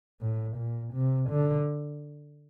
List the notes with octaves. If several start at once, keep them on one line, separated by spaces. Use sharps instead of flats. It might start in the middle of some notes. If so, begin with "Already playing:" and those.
A2
A#2
C3
D3